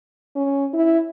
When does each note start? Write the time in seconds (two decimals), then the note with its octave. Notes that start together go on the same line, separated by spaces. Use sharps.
0.36 C#4
0.73 E4